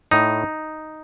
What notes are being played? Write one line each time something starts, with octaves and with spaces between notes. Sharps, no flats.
A2 D#4